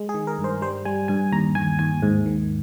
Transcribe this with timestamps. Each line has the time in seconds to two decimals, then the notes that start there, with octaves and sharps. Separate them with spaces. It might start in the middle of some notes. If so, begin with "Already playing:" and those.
Already playing: G#3
0.09 G#4
0.14 D#3
0.27 A#4
0.39 G2
0.44 C5
0.62 G3 C5
0.85 G3 G#5
1.08 G2 G#5
1.32 D#2 A#5
1.55 D#2 G#5
1.79 D#2 G#5
2.02 G#2
2.26 D#3